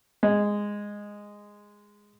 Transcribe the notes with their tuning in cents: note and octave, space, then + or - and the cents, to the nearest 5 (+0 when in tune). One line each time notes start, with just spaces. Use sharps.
G#3 -10